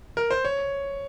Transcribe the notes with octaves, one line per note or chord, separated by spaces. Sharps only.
A#4
C5
C#5